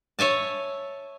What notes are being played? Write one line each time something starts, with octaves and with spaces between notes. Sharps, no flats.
C#5 E5 G#5 A5